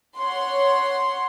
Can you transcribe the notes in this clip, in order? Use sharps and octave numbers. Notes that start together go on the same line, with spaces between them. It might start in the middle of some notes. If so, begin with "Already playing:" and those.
C#5 F#5 C6